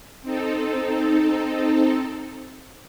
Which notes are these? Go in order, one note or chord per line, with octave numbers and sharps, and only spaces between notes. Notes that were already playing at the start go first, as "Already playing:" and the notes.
C4 D#4 A4